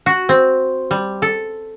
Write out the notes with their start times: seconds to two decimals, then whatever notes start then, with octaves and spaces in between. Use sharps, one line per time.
0.06 F#4
0.29 C4
0.91 G3
1.22 A4